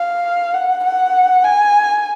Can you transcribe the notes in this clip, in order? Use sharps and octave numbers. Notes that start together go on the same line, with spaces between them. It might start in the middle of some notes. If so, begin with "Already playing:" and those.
Already playing: F5
F#5
F#5
G#5